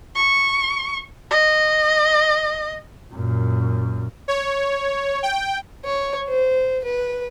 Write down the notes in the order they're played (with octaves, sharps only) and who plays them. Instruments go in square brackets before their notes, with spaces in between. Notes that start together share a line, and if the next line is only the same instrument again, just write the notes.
[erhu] C#6
D#5
[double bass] F#2 A#2
[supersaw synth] C#5
G5
[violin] C#5
C5
B4